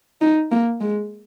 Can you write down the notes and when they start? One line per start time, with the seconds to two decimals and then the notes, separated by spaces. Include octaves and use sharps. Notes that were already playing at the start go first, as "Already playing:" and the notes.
0.22 D#4
0.51 A#3
0.81 G#3